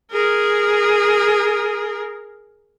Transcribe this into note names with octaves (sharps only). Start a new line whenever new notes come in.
G#4 A#4